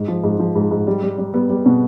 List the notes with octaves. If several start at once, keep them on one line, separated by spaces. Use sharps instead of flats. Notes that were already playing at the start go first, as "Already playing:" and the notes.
Already playing: G#2
F3
G#2
F3
G#2
G#2
G3
G3
G3
G3 B3
G3
B2